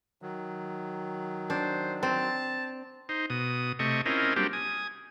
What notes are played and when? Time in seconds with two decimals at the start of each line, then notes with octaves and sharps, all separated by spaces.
0.22 D#3 F#3
1.50 D4 C5
2.03 C4 A5
3.09 D#4 C5
3.30 B2 D#6
3.79 C3 A3 D#5 C#6
4.06 C4 C#4 E4 F4 A#4 D#5
4.36 F#3 G3 A#3 C4 D4 G4
4.53 G#5 D#6